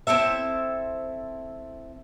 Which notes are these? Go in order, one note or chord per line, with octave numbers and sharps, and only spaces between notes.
C4 E4 A4 E5